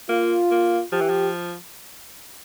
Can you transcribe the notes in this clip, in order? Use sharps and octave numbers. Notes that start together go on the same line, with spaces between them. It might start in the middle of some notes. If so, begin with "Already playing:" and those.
A#3 F4
A#3
F3 G4
E3
F3